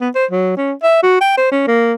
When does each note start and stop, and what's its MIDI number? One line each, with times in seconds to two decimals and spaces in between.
0.01 0.09 59
0.15 0.25 72
0.31 0.56 54
0.57 0.73 61
0.83 1.01 76
1.03 1.18 66
1.21 1.34 79
1.38 1.51 72
1.52 1.66 61
1.67 1.94 58